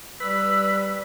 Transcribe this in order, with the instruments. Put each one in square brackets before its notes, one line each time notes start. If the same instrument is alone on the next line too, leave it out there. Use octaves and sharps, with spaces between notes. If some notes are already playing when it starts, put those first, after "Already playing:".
[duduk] G3 [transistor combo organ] B4 [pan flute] E6